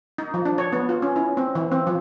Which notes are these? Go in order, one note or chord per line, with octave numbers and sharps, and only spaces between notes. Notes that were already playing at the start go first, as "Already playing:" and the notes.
D#4
F3
D4
C#5
B3
F4
C#4
E4
C4
E3
C4
F3